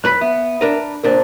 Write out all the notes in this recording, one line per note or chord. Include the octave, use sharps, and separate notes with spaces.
F#2 B4 B5 F#6 B6
B3 E5
D4 A#4 B4
C#2 A#2 D4 A#4 C5